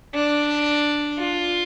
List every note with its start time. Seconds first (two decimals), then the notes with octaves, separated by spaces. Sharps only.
0.15 D4
1.18 F4